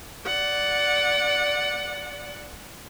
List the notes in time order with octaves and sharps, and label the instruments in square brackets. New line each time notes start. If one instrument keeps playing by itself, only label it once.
[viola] D5 F#5